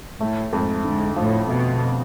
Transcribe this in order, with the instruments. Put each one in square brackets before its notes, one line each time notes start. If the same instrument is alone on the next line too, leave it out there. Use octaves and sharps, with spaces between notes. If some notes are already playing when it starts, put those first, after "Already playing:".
[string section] A2 [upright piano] A3
[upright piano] F2 [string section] G#2
[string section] G#2 [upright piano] D3
[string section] A2 [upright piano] F3
[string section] B2 [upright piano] A3